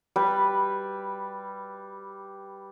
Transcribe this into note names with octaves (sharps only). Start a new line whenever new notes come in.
G3 B4